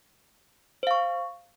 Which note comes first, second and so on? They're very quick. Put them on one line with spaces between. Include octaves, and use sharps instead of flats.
C5 F5 C#6